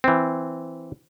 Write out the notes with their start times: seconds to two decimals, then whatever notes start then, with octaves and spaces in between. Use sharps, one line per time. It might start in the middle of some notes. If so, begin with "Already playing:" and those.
0.04 E3 C4